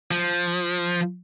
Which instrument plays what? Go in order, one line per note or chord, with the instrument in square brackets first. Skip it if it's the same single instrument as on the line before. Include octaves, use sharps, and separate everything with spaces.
[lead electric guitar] F3